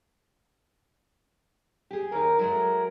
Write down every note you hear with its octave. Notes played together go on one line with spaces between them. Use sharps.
G4 G#4
D#2 D#4 A#4
F#3 G#3 A3 A#4